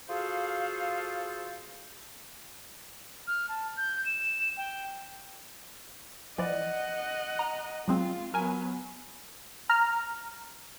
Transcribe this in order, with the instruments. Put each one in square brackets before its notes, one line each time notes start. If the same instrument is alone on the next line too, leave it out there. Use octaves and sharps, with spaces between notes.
[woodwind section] F4 F#4 G#4 A4 C5 F5
[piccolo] F6
A5
G6
E7
G5
[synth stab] E3 F3 D5 [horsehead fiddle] D#5 F#5
[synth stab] A#5
[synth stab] F#3 G#3 C4 [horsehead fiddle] F4
[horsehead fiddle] F#3 B3 [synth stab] A#4 G#5
[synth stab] A#5 F6